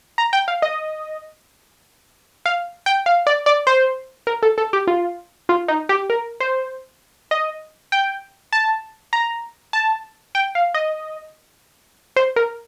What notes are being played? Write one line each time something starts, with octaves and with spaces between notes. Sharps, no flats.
A#5
G5
F5
D#5
F5
G5
F5
D5
D5
C5
A#4
A4
A4
G4
F4
F4
D#4
G4
A#4
C5
D#5
G5
A5
A#5
A5
G5
F5
D#5
C5
A#4